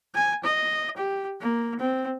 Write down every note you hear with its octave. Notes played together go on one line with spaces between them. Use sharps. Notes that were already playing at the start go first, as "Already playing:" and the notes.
G#5
D#5
G4
A#3
C4